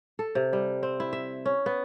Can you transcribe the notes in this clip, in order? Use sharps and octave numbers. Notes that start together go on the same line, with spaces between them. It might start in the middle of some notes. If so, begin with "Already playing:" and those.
A4
C3
G3
C4
E4
E5
C#4
B3